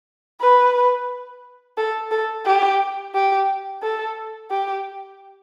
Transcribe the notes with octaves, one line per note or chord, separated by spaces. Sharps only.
B4
A4
A4
G4
G4
A4
G4